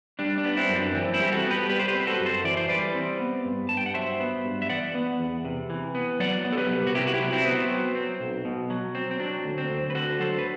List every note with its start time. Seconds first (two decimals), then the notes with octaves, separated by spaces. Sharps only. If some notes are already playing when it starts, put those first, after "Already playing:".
0.19 G3 D4
0.38 D4
0.45 B3
0.57 C4 E4
0.70 F#2
0.76 D4
0.94 E3 C4
1.13 C4 E4
1.19 G3 G4
1.32 F#4 A4
1.45 B3
1.50 G4 B4
1.69 G3 G4 B4
1.79 C5
1.88 G4 B4
1.95 C4
2.07 F#4 A4
2.19 F#2
2.26 A4 C5
2.44 E3 D5
2.57 C5
2.69 G3 B4 D5
2.95 C4
3.20 B3
3.45 G2
3.69 G2 A5
3.77 G5
3.86 F#5
3.94 F#3 C5 E5
4.20 B3
4.45 G2
4.62 E5
4.69 E3 D5 F#5
4.95 B3
5.20 E2
5.45 C3
5.70 E3
5.95 B3
6.20 F#3 D5 F#5
6.45 B3
6.52 A4
6.57 G4 B4
6.70 C2
6.87 F#4
6.94 C3 E4 G4
7.07 F#4
7.14 E4 G4
7.20 F#3
7.33 C4 E4
7.45 B3
7.51 C4
7.70 F#3
7.95 C4
8.20 B1
8.45 B2
8.70 F#3
8.95 C4
9.11 C4
9.20 F#3 D4
9.45 D2
9.58 C4
9.70 D2
9.90 B4
9.95 D3 F#4 A4
10.20 F#3 A4 C5
10.39 B4